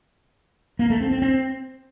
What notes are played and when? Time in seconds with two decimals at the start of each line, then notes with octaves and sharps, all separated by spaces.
0.79 A#3
0.90 A3
1.01 C4
1.11 C4
1.22 C4